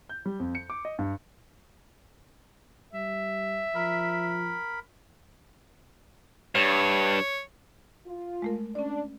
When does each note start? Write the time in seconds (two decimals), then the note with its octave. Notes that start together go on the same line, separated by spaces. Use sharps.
0.09 G6
0.26 G3
0.40 F2
0.55 C#7
0.70 D6
0.85 D#5
0.99 G2
2.93 G3 E5
3.75 F3 A#4 B5
6.55 G2 C#5
8.07 F4
8.42 G#3 A3 A#4
8.75 C#4 D4 D5